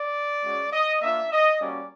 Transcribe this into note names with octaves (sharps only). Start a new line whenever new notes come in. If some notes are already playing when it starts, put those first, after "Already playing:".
Already playing: D5
G#3 C#4 F#4
D#5
A#3 D4 F4 E5
D#5
G3 A#3 C#4 F#4 D5